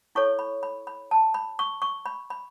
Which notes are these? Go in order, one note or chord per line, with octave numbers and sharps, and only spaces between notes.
E4 A4 C#5 C#6
B5
B5
B5
A5
B5
C#6
C#6
B5
B5